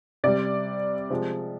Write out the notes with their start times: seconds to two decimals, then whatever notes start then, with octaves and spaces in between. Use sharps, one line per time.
0.24 C3 G3 D5
1.10 C3 F3 G#3